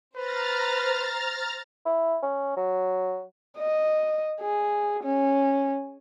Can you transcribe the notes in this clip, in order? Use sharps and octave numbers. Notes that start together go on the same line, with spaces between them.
B4 C5 A#5 F6 A6
E4
C#4
F#3
D#5
G#4
C#4